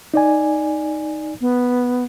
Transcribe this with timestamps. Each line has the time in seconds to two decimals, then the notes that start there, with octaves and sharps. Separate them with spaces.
0.14 D#4 D5 G#5
1.41 B3